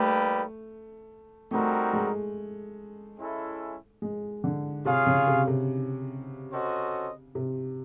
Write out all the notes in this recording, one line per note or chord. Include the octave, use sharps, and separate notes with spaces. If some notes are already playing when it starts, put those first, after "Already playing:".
Already playing: G3 A3 A#3 D#4 G4 B4
G3 A3 C4 D#4 F#4 A#4
G#3
G#3 C#4 E4 A4
G#3
D3
C3 F4 G#4 C#5 F5
C#3
C3
C3
C#4 F#4 A4 C5 D#5
C3